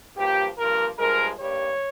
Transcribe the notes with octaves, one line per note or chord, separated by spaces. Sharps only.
G2 F3 A#3 G4
G2 F3 A#3 A#4
G2 F3 G#3 A#4
G2 G3 A#3 C#5